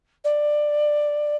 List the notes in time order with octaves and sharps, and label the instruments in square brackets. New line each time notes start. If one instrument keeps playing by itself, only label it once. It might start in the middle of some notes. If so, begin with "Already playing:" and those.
[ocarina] D5